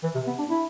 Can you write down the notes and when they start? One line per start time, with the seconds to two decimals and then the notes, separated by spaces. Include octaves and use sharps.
0.03 E3
0.15 C3
0.27 B3
0.39 D4
0.50 E4